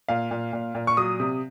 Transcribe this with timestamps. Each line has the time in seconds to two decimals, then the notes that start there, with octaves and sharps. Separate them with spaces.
0.09 A#2 F5
0.31 A#2
0.53 A#2
0.75 A#2
0.87 C#6
0.97 F#3 D#6
1.20 C3